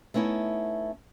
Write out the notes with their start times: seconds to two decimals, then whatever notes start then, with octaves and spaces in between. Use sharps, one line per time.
0.14 A3 B3 C#4 D#4 E4